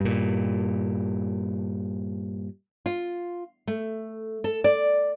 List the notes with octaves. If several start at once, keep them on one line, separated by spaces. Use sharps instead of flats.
G2 A#2
F4
A3
A4
D5